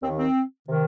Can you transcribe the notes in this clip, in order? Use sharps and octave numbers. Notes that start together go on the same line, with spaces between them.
D#2 D#3 C4
C4
C3 D#3